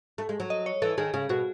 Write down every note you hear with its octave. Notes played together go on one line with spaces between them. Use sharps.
A3
G#3
F#3
D#5
C#5
E3 A4
D#3 G#4
C#3 G#4
B2 F#4